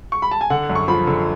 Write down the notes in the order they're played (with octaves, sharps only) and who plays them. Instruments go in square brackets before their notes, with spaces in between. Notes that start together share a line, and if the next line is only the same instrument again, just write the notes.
[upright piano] C#6
B5
A5
G#5
[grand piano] D3 [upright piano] F#5
[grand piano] F#2
[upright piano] C#6
[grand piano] F3 [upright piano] B5
[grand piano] D3